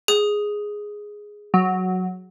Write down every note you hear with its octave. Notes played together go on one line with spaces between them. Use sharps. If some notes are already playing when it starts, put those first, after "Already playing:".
G#4 D#6
F#3